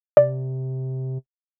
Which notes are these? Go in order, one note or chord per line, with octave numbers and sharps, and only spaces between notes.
C3 D5